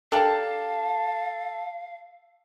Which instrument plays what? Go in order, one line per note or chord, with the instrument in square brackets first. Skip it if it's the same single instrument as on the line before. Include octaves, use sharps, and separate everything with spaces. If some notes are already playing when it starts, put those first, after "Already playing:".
[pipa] D4 G4 A#4 [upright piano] A4 A5 [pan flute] F5